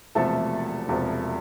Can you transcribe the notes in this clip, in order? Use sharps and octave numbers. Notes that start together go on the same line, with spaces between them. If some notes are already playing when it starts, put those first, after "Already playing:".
E1 E2 C3 F3 A3 A4
E1 E2 C3 F3